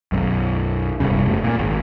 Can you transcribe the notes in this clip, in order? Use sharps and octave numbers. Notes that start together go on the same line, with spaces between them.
B1 F#2
E1 C2 G2 C#3
F1 F#2 A3
A#2 A#3
G#1